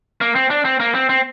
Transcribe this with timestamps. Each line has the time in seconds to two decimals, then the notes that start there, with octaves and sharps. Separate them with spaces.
0.21 A#3
0.35 C4
0.50 D4
0.65 C4
0.80 A#3
0.95 C4
1.09 C4